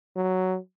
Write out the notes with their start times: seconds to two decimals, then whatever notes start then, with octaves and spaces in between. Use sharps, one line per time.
0.16 F#3